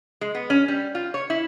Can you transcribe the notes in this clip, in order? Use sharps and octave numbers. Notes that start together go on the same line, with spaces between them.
G#3
B3
C#4
G3
F4
C#5
E4